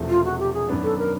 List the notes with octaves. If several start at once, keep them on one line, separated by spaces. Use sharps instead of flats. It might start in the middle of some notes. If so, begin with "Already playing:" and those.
Already playing: E1 E2 C3 F3 A3
F4
F#4
G4
G#4
F#2 D#3 F#3 B3 D4
A4
A#4